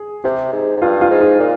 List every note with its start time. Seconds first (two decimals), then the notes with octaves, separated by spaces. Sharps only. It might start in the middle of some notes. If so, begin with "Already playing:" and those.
Already playing: G#4
0.24 C3 G4
0.52 G#2
0.77 G#2
0.82 G2 F4
1.01 F4
1.10 G#2
1.20 D#4
1.40 A#2